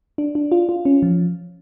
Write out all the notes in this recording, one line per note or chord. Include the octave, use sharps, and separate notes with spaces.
D4
D4
F4
F4
C#4
F3